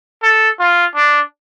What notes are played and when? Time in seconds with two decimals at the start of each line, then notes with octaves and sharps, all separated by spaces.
0.23 A4
0.60 F4
0.95 D4